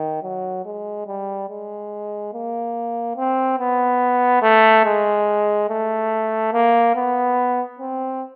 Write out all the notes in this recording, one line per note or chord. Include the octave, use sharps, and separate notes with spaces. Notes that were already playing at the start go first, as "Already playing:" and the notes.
Already playing: D#3
F#3
G#3
G3
G#3
A#3
C4
B3
A3
G#3
A3
A#3
B3
C4